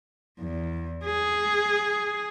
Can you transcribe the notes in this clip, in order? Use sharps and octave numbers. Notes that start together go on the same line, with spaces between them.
E2
G#4